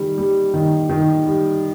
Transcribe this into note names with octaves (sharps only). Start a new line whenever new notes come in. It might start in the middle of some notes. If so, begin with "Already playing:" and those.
Already playing: D#3 G3
G3
D#3
D#3
G3